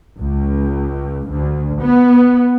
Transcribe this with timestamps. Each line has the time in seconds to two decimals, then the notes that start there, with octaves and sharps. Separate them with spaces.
0.18 C#2
1.29 D2
1.81 B3